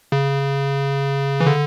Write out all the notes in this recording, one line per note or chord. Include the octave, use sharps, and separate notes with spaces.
C#3
E3
D3